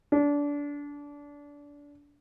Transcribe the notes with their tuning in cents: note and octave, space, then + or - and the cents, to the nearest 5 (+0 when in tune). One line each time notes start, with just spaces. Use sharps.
D4 -25